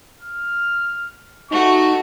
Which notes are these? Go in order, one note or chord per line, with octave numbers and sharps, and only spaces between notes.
F6
A3 D#4 F#4 C#6